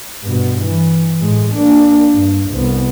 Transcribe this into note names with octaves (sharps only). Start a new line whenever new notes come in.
G2 B2
E3
A2 G#3
A#3 D4
G2
C2 B3